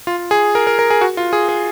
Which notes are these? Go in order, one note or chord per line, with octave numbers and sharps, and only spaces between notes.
F4
G#4
A#4
A#4
A#4
G#4
F#4
F4
G#4
G#4